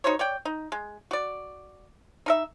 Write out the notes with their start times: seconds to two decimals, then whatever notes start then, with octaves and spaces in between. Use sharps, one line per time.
0.04 D#4 F#4 C5 C#5
0.19 C#5 D5 G5
0.45 D#4
0.72 G#3
1.11 F#4 D5
2.26 D#4 A#4 E5